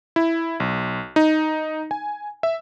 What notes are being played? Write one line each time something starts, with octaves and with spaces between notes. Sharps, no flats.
E4
B1
D#4
G#5
E5